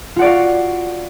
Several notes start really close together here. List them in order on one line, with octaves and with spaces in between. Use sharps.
F4 F#5 D5 F#4 F5